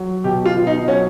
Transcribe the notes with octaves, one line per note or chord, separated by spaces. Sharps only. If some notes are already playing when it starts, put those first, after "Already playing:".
Already playing: F#3
B2 G4
F4
B2
D#4
F#3 C#4